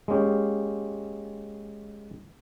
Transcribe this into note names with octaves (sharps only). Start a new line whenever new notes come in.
G#3 A#3 C#4 G4